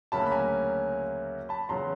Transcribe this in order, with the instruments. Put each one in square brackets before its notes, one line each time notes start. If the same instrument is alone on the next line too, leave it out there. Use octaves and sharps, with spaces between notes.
[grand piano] D2 C#3 F#3 A#3 C#4 A5 B5
B5
G#5 A#5
A5 B5
E2 C#3 F#3 A#5 C6